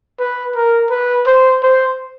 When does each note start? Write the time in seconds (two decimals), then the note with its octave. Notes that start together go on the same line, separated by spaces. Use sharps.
0.20 B4
0.56 A#4
0.91 B4
1.27 C5
1.63 C5